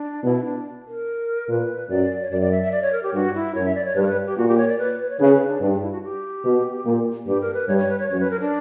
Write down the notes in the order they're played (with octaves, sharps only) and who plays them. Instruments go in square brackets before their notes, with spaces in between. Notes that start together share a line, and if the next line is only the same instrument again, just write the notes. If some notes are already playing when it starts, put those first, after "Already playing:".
Already playing: [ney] D4
[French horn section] B2 [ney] E4
[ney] D4
A#4
[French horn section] A#2 [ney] B4
[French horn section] F#2 [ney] D5
[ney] C#5
[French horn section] F#2 [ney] D5
[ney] D5
E5
E5
D5
C#5
A#4
G4
[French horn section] G2 [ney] F#4
[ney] E4
[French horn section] F#2 [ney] C#5
[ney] E5
D5
C#5
[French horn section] G2 [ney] B4
[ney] A#4
B4
G4
[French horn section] A#2 [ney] F#4
[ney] G4
C#5
D5
B4
B4
C#5
[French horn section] C#3 [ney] B4
[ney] B4
D4
[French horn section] G2 [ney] D4
[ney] D4
E4
F#4
G4
[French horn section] B2
A#2
[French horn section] G2 [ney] G4
[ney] A#4
B4
[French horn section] G2 [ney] C#5
[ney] C#5
B4
C#5
[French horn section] F#2 [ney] C#5
[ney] B4
A#4
D4